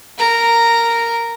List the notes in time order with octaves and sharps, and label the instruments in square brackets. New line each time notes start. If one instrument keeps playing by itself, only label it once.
[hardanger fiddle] A#4 A#5